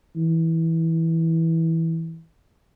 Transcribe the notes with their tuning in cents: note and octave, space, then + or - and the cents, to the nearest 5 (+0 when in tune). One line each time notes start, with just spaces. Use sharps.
E3 -15